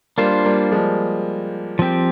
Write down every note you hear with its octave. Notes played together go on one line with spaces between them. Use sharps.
G3 A#3 D4 F4 C5
G3 A#3
F3 G#3
F3 C4 G4